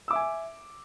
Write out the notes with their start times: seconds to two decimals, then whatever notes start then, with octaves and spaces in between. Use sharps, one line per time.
0.08 E6
0.11 D6
0.13 E5
0.16 G#5